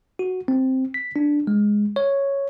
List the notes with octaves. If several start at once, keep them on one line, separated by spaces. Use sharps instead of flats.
F#4
C4
B6
D4
G#3
C#5